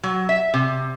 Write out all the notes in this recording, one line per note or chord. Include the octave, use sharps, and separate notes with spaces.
F#3
E5
C3